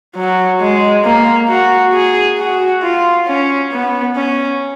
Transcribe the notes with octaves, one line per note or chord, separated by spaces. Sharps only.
F#3
G#3
A#3
F#4
G#4
F#4
F4
C#4
B3
C#4